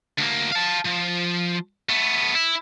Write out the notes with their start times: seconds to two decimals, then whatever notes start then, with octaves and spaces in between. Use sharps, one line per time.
0.18 D2 A#3
0.52 F5 A5
0.86 F3
1.89 A3 B3
2.35 E4